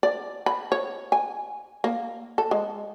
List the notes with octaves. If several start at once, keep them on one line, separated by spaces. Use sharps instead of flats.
D5
B5
C#5
G#5
A#3
A4
G#3